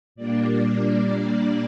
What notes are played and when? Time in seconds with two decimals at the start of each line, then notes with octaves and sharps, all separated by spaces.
0.15 A#2 G3 A#3 D4 D5
0.61 D5